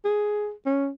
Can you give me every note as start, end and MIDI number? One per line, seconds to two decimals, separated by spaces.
0.05 0.51 68
0.66 0.88 61